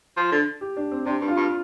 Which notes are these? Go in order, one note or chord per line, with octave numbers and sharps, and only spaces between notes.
F3
D3
G4
D4
C4
C3 D4
G2
F4
G2